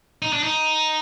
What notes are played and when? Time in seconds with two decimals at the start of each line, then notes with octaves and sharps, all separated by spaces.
0.22 D#4
0.33 D4
0.43 D#4